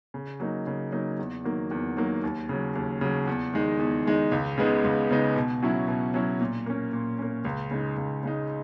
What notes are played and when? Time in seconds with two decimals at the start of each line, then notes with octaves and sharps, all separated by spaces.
0.14 C#3
0.40 F#3 A#3 D#4
0.67 C#3
0.92 F#3 A#3 D#4
1.19 E2
1.44 D#3 F#3 A#3
1.71 E2
1.96 D#3 F#3 A#3
2.23 D#2
2.49 C#3 F#3
2.75 D#2
3.01 C#3 F#3
3.27 E2
3.53 D#3 G#3 D#4
3.79 E2
4.06 D#3 G#3 D#4
4.32 C#2
4.58 C#3 G#3 B3 D#4
4.84 C#2
5.11 C#3 G#3 B3 D#4
5.36 B2
5.62 F#3 C#4 E4
5.88 B2
6.14 F#3 C#4 E4
6.41 A#2
6.66 A#3 C#4
6.93 A#2
7.19 A#3 C#4
7.45 C#2
7.71 C#3 G#3 D#4
7.97 C#2
8.23 C#3 G#3 D#4